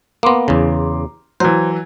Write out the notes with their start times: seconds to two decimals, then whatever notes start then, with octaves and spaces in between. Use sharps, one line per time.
0.23 A#3 B3 A#5 C6 D6
0.48 E2 C#3
1.40 E3 F#3 C5